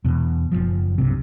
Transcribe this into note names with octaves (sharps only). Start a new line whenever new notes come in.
E2 B2
F#1 C2 F3
B1 G2 C3